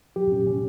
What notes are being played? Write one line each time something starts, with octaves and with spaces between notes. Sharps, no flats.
F#3 G4
C#4
C#4